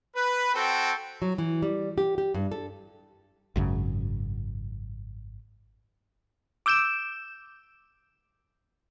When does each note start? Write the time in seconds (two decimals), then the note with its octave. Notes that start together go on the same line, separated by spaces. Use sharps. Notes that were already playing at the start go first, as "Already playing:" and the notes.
0.16 B4
0.55 C4 F#4 A4 G5
1.22 F#3
1.38 E3
1.62 G3
1.98 G4
2.18 G4
2.34 G2
2.52 A4
3.56 G#1 F#2 C#3
6.66 D6 E6 G6 D7 E7